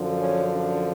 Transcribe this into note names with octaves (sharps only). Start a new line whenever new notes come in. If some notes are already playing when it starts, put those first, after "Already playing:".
Already playing: F#2 D3 F3
C#4
D4